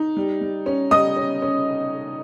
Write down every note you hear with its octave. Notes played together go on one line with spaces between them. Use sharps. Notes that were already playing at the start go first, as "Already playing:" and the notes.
Already playing: D#4
G3
G3
C#4
G3 D#5 D#6
C#4
C#4